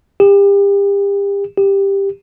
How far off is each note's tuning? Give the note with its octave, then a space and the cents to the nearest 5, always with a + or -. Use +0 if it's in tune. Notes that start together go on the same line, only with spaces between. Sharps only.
G4 +35
G4 +10